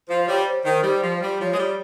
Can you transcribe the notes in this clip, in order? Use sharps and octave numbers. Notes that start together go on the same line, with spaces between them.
F3 C5
G3 C#5
C5
D#3
G3
F3
G3
F3 C#5
G#3
G3